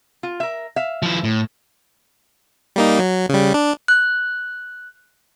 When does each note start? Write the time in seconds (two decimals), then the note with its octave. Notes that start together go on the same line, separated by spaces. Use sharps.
0.23 F4
0.40 A#4 E5
0.76 E5 F5
1.02 F3 E4
1.24 A2
2.76 G3 A#3 D#4
2.99 F#3
3.29 C#3 G3
3.54 D4
3.88 F#6